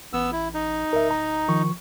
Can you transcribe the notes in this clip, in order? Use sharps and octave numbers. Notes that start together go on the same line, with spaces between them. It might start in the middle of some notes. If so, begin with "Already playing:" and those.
A1 B3 E6
E4
D#4
D1 A#4 E5
A#5
D#3 F3 C#6